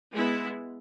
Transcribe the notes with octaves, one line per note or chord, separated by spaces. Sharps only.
G#3 B3 E4